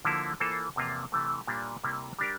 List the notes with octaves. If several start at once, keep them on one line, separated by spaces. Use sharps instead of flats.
D3 F3 A#3 E4
E3 A#3 F4 A4 C5
E2 C3 F3 A#3 F4
C3 E3 A3
A#2 G3 A#3 D4
C3 G3 A#3 E4
G3 D4 G4 A#4